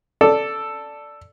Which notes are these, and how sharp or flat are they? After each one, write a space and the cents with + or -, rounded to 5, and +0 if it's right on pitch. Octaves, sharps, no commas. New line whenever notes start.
A4 +0 D5 +0